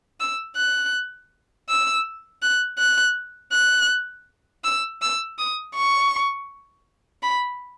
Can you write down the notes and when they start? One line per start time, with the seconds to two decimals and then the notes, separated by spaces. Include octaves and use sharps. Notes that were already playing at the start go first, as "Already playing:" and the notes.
0.20 E6
0.57 F#6
1.69 E6
2.43 F#6
2.79 F#6
3.53 F#6
4.64 E6
5.02 E6
5.38 D#6
5.75 C#6
7.23 B5